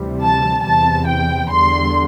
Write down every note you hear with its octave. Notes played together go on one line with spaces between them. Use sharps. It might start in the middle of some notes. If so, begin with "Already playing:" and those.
Already playing: D2 C3 E3 G3
A5
E2 C3 E3 A5
G5
E2 D3 G3 C6